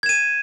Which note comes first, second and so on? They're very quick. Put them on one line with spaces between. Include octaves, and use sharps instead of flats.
G#6 E7 D#7